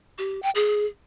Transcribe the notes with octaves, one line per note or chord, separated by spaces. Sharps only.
G4
G5
G#4